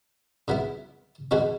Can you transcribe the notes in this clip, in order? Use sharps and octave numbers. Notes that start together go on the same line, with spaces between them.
C#3 F#3 B3 E4
E2 B2 G#3 C#4 F#4